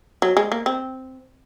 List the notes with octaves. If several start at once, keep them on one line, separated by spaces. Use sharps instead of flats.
F#3
G#3
A#3
C4